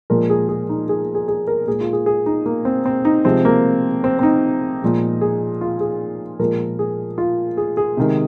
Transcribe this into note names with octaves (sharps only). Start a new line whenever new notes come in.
A#2 F3 G#3 A#4
G#4
G#4
D#4
G#4
G#4
G#4
A#4
A#2 G#3 G#4
F4
G#4
G#4
D#4
A#3
C4
C4
D#4
C3 F3 G#3 C4
A#3
C4
C4
D#4
A#2 F3 G#3
G#4
F4
G#4
A#2 F3 G#3 A#4
G#4
F4
G#4
G#4
C3 D#3 G#3